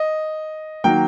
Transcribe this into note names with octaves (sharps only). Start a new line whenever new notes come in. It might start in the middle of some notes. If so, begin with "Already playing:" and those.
Already playing: D#5
D#3 F#3 A#3 G5